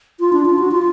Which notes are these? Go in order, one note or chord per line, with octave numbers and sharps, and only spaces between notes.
F4
D4
F4
F#4
F4